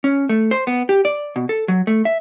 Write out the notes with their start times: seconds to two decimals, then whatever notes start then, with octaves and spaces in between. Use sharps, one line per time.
0.04 C#4
0.29 A3
0.51 C5
0.67 B3
0.89 G4
1.05 D5
1.36 B2
1.49 A4
1.68 F#3
1.87 A3
2.05 E5